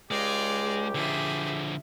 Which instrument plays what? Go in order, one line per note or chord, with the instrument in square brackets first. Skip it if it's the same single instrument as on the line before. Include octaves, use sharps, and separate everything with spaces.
[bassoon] C#2 [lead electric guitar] G#3 [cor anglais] G4 [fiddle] D5 F5
[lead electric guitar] D3 F3 [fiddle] G#4 E5